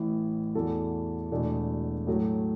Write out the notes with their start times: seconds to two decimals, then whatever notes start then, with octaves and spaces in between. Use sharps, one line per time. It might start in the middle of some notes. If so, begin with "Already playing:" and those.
Already playing: A1 A2 E3
0.55 E2 E3 A3 F#4 A4
1.31 E1 E2 B2 A3 D4
2.07 A2 F#3 A3